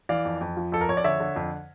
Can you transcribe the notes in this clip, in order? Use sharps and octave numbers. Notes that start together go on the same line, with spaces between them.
E3 D5 F5
F2
F2
F3
F2 A4
A#4
F2 C#5
D5
D3 C#5 E5
D3
F2